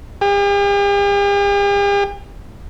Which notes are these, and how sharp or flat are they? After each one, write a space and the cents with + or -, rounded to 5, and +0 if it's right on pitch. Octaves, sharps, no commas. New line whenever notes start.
G4 +45